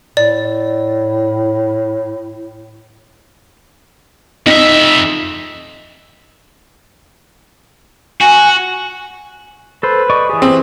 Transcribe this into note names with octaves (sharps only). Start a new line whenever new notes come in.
A2 D5
F2 D#4 E5
F#4 G#5
A4 B4 C5
D5 D#5 C#6
E3 G4 G#4
C4